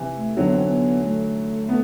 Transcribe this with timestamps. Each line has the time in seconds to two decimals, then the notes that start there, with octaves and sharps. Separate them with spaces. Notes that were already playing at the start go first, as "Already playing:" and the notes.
Already playing: C3 E3
0.15 A3
0.36 D3 F#3 C4
0.45 B3
0.54 C4
0.65 C4
0.70 B3
1.03 A3
1.69 B3